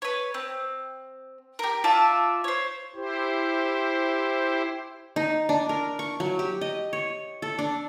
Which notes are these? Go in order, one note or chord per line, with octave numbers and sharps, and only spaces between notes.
B4 C#5
C4
G4 A#4
F4 D5 E5 A5
C5 C#5
E4 G4 C5
D#4
D4
A#4
C#6
F#3
G4
D#5
C#5
A4
D4